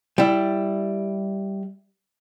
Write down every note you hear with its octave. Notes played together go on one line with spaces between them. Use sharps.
G3 E4